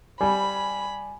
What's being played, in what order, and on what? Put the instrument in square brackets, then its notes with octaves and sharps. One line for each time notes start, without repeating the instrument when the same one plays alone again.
[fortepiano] G3 [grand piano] G#5 [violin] B5